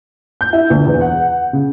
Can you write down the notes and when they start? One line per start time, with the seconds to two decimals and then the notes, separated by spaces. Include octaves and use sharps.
0.41 G6
0.53 E4
0.70 D2
0.86 E2
1.01 F#5
1.53 C#3